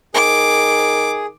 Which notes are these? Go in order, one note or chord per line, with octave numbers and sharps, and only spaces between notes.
D#3 G#4 D6